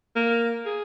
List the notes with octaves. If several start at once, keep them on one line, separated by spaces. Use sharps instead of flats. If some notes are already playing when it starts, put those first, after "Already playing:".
A#3
G#4